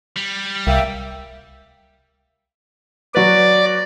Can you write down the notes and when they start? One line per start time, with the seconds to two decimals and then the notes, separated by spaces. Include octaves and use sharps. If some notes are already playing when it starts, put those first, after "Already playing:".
0.17 G3
0.67 C2 A#3 E5 G5
3.15 F#3 B4 D5